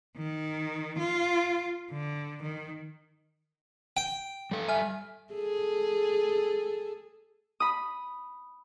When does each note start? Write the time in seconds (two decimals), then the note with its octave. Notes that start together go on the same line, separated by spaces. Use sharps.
0.17 D#3
0.99 F4
1.92 D3
2.43 D#3
3.97 G5
4.51 G3 A4
4.69 E5 G#5 F6
5.34 G#4 A4
7.60 B5 D#6